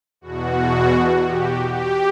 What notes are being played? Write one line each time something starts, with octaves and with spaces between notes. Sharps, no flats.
E2 B2 F#4
G4
G4